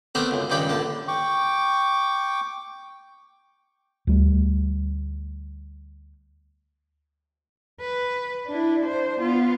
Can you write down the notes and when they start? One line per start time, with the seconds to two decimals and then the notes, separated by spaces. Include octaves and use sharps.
0.15 A3 B3 C4 D4 A#4 E5
0.31 C#2 F#2
0.50 C#2 G2 D#3 D5 G5 B5
0.69 A#1 D3 A5
1.08 G5 C#6 D6
4.07 D2 G3 A3
7.81 B4
8.48 D4 E4
8.85 D4 C5
9.21 B3 F4